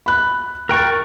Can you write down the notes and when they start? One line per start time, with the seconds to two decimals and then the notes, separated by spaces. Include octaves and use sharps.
0.06 B5 F#6
0.69 A#4 G5 C#6 F#6 A6